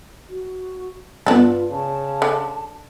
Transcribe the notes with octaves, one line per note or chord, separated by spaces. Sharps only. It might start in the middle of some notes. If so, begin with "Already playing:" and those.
F#4
G2 B3 D4 F4 A4
C#3 A5
D3